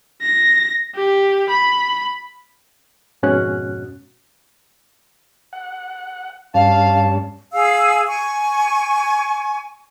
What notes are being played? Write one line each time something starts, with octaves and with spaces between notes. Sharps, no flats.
A#6
G4
B5
F2 G#2 B2 C#4 F#4 F#6
F#5
G2 C#4 F5 A5
G#4 F5 E6
G#5 C#6